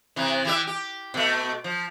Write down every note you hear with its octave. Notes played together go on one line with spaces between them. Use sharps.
C3 E3
E3 G4 E5
G4
B2 A3
F3